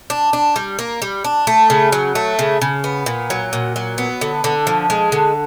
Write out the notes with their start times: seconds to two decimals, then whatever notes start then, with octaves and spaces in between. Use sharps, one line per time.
0.10 D4
0.33 D4
0.56 G3
0.79 A#3
1.02 G3
1.24 D4
1.47 A3
1.70 C#3
1.92 F#3
2.15 A3
2.39 C#3
2.61 C#3
2.84 B3
3.06 A#2
3.30 F#3
3.53 A#2
3.76 F#3
3.98 B3
4.21 D3
4.44 D3
4.67 F3
4.90 G#3
5.12 D3